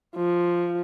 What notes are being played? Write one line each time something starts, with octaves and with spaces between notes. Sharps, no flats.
F3